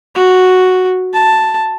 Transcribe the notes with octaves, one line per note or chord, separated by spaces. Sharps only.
F#4
A5